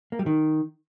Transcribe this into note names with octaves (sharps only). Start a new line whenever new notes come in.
A#3
G3
D#3